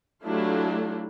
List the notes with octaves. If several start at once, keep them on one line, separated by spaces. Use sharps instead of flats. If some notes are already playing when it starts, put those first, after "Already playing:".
F#3 A3 D4 E4 F4 G4